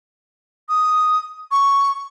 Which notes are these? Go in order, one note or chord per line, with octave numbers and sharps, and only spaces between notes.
D#6
C#6